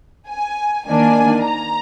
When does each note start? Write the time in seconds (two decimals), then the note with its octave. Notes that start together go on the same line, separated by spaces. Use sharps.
0.29 G#5
0.87 D#3 A#3 D4 G#5
1.47 A#5